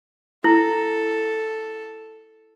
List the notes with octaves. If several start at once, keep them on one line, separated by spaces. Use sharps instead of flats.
E4 A4